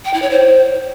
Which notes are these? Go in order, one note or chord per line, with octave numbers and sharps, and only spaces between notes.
G5
E4
C#5
C5